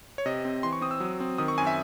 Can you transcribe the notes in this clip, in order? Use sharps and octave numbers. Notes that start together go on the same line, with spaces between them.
C#5
C3 D#5
C4
E3 C6
C#6
C4 D#6
E6
F#3
C4
D#3 D#6
C#6
F#2 G#5
E5